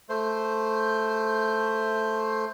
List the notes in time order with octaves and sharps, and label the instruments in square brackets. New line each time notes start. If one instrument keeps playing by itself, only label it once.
[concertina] A3 C5